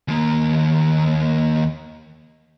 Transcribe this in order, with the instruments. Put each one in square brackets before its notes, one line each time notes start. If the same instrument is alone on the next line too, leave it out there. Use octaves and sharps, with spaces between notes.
[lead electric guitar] D#2 A#3